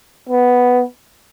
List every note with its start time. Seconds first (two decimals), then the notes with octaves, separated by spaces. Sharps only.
0.29 B3